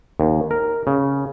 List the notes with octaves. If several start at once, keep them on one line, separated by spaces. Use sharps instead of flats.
D#2
A#4
C#3